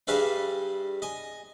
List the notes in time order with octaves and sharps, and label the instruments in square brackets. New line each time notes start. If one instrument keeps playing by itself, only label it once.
[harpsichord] G2 G3 G#4 B4 E5 F5
D#5 G#5